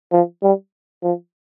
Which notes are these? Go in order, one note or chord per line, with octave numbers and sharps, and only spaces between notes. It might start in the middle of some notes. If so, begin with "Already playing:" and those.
F3
G3
F3